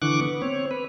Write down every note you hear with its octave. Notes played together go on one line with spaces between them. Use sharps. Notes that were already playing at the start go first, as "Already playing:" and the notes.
D3 E3 C#6 D6 F#6
B3
C4 C#5
B4